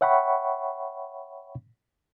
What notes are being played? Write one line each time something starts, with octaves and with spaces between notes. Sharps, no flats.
C#5 E5 F#5 G5 B5 C#6